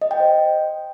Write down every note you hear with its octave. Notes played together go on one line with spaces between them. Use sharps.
D#5
G5
C5